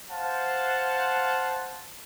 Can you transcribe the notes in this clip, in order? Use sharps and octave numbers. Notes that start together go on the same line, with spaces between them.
C5 F5 F#5 A5